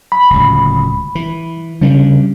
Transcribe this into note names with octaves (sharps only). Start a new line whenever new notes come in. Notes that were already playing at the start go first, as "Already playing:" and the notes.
B5
D1 C#2
E3
C#3 G3 C#4 D4